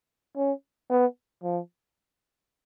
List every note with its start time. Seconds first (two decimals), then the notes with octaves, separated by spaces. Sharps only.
0.37 C#4
0.90 B3
1.44 F3